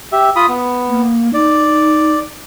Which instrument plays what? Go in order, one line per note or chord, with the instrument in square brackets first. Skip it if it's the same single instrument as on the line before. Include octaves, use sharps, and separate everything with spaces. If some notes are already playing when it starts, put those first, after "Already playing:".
[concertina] G4 E5
F4 B5 D#6
B3
[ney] A#3
[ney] D#4 [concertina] D5